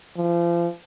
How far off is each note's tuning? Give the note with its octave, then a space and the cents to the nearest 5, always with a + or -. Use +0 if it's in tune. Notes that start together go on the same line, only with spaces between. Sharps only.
F3 -35